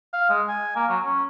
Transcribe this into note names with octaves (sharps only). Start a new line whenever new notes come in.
F5
G#3
G#5
A#3
F#3
C#4